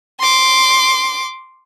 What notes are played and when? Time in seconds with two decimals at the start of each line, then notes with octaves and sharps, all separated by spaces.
0.20 C6 D6